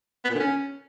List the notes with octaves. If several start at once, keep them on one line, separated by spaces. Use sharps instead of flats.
B3
A#2
D3
C#4